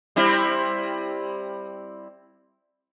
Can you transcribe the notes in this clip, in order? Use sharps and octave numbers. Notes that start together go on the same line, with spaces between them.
G3 C4 E4